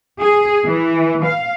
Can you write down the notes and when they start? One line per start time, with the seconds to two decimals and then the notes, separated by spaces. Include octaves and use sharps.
0.20 G#4
0.67 E3
1.25 F5